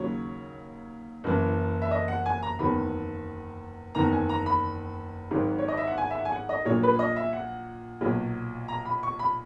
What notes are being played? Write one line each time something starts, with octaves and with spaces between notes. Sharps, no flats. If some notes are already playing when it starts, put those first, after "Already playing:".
Already playing: D#2 C#3 F#3 C#5
F#1 F#2 E3
E5
D#5
F#5
G#5
A#5
F#1 E2 D#3 F#3 B5
F#1 E2 D#3 A#5
G#5
A#5
B5
G#1 G#2 D#3 F#3
C#5
D#5
E5
F#5
G#5
E5
F#5
G#5
F#5
D#5
A#1 A#2 F#3 C#5
B4
D#5
E5
F#5
B1 A#2 F#3
A#5
B5
C#6
B5